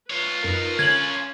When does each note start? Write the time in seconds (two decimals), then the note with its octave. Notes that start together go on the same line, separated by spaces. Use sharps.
0.10 F4 B4 C#5
0.44 F#2 D#4 A#4 B4
0.79 D3 C#4 G#6 F#7